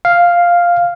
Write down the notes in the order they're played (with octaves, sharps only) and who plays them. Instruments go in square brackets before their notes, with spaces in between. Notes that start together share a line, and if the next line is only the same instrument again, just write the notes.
[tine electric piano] F5